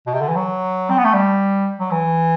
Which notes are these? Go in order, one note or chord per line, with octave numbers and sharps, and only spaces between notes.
B2
C3
D3
E3
F#3
C4
B3
A3
G3
F#3
E3